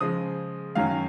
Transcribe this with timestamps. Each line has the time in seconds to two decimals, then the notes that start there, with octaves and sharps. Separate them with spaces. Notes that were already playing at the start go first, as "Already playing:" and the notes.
0.01 C#3 F3 G#3 D#6
0.75 F#2 D#3 F#3 C#4 F5